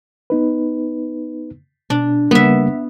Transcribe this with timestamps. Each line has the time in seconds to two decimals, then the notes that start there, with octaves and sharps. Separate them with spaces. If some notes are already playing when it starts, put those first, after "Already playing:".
0.30 B3 D#4 B4
1.90 B2 D4
2.31 C#3 G3 A#3 B3 E5